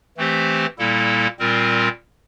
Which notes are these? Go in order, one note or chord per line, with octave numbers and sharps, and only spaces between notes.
E3 A3 C4 G4 C5
A#2 G3 A#3 E4 A4
A#2 G3 C4 F4 A#4